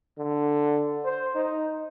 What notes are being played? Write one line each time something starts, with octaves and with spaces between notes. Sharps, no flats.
D3
C5
D#4